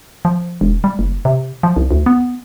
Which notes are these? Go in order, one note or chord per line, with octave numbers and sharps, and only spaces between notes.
F3
E1
G3
F#1
C3
F3
C2
D2
B3